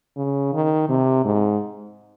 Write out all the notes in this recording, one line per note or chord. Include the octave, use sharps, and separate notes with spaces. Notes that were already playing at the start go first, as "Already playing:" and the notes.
C#3
D#3
C3
G#2